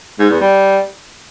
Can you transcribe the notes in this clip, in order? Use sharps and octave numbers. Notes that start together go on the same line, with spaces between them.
G#2
E2
G3